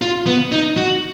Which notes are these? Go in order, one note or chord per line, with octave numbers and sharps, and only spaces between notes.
F4
B3
D#4
F#4